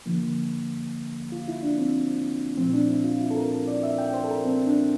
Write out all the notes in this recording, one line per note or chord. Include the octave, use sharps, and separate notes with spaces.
D3 F3 A#3
F4
E4
D4
C4
A#2 F3 A3 C4
D4
E4
F4
E4
A4
A#4
D5
E5
G5
C5
A4
A#4
C4
D4